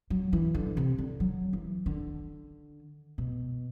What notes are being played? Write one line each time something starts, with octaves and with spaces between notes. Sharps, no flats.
F#3
E3
D3
C3
D3
F#3
E3
D3
B2